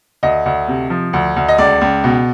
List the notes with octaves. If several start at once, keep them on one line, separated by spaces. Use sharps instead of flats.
D2 D#5
D2
C3
F3
D2
D2
D#5
C#2 D5
C#2
B2